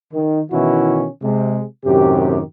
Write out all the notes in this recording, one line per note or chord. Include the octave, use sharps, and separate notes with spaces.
D#3
B2 D#3 E3 C#4 E4 F#4
C3 G#3
F#2 A2 C3 D#3 G4